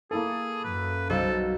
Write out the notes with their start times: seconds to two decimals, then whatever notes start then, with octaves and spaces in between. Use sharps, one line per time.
0.11 A#3 E4 G#4 A4
0.64 F#2 B4
1.10 B1 G3 A4 C5 F5